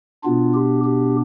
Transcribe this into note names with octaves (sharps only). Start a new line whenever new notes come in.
B2 B3 D4 F4
G4
G4